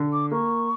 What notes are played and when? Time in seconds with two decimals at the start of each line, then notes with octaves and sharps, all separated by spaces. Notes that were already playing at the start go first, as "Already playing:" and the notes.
Already playing: D3
0.12 D6
0.31 A#3 C#6